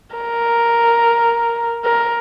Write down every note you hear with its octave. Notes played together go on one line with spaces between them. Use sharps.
A#4
A#4